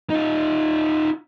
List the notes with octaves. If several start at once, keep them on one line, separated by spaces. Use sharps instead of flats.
D#4 F4